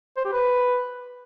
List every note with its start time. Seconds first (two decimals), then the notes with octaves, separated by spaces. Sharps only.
0.17 C5
0.25 G4
0.32 B4